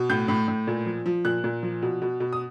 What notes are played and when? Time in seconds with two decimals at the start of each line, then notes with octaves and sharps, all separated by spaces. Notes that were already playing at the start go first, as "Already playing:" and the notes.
Already playing: B2
0.10 A2 G6
0.28 A2
0.48 A2
0.67 A#2
0.86 F3
1.06 F3
1.25 A#2 F#6
1.44 A#2
1.63 F3
1.83 B2
2.02 B2
2.20 B2
2.33 D#6